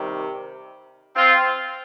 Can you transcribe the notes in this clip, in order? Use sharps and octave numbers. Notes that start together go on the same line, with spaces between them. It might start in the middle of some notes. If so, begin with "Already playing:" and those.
Already playing: C3 D#3 G3
C4 F4